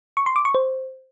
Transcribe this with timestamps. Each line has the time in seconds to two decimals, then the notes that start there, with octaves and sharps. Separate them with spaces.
0.17 C#6
0.26 C6
0.36 D6
0.45 C#6
0.55 C5